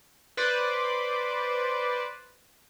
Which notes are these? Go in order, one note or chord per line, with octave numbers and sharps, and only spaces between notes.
B4 C5 D5